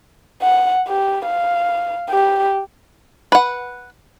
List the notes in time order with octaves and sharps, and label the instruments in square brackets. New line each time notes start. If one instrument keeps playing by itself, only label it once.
[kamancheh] F#5
G4
F5
G4
[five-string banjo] B4 F#5